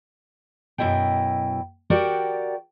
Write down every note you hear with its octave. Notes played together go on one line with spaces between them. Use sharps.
F#2 B2 E4 D#5 G5
F#4 G4 A#4 D5 F#5 G5